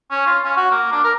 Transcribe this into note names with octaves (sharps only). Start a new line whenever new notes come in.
C#4
F4
C#4
F#4
A#3
D4
A#4